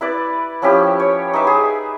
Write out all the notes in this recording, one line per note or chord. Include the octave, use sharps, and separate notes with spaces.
E4 B4 D5
F3 C#4 E4 G4
C#5
D#4 B4 E5 D6
G#4